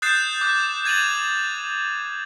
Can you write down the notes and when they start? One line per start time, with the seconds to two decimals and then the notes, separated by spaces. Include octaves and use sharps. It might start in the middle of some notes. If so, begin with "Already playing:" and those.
0.02 D#6 F#6 G6 A6 C7 E7
0.41 D6 F#6
0.85 G#6 A6 D#7 F7 F#7